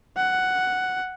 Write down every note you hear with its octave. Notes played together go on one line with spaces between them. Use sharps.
F#5